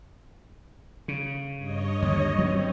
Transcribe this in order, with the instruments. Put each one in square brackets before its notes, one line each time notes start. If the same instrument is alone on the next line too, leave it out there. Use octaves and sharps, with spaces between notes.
[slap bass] C#3
[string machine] G2 C#5 D#5
[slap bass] D#2 D3
[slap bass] F#3 G3 C#4 [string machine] C4